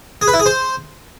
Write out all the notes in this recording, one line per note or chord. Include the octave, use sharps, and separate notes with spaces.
G#4
B4
E4
G#4
C5